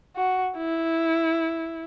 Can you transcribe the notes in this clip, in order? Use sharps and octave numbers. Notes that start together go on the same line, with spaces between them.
F#4
E4